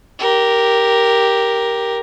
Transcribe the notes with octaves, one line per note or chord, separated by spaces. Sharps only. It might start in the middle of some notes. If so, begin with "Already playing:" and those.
G4 A#4